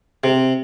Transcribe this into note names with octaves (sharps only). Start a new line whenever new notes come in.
C3